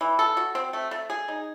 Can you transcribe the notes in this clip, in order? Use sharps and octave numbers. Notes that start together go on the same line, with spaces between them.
E3
A4
F#4
C4
A3
A3
G#4
D#4